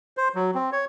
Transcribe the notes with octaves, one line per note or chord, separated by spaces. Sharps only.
C5
F#3
C4
C#5